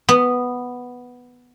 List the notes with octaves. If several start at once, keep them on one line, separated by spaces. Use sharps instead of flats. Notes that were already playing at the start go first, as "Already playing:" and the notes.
B3